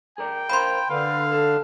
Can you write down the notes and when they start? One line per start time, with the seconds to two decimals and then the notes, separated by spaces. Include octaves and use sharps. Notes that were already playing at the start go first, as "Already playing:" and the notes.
0.18 G#4 A#4 D5 G5
0.50 A#4 C5 F5 B5 C6
0.90 D3 B4 F5
1.32 A4